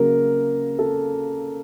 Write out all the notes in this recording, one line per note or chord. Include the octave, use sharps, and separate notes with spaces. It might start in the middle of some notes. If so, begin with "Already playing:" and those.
Already playing: C#3 F#3 A#3 A#4
A4